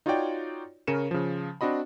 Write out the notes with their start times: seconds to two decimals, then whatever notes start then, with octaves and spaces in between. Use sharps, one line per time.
0.06 D#4 F4 F#4 C#5 D5 G5
0.87 C#3 C#4 A#4 C#7 D#7 E7
1.11 C#3 F3
1.61 C4 D4 F#4 D#5 B5